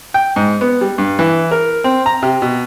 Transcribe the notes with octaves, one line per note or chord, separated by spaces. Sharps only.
G5
G#2
B3
G3
G2
E3
A#4
C4
A#5
C3
B2